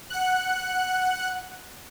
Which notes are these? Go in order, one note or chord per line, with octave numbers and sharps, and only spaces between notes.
F#5 F#6